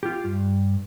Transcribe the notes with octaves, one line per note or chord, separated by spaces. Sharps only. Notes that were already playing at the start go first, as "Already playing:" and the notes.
F4 G4
G2